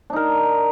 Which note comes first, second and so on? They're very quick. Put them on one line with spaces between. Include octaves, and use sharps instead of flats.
D4 D#4 A#4